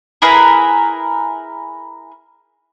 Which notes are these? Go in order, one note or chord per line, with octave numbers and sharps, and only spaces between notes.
E4 G#4 A#4 B4